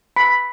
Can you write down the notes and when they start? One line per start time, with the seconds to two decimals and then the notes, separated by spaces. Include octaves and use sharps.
0.16 B5